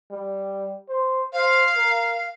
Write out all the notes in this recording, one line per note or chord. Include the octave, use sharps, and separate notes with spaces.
G3
C5
C5 F5
A#4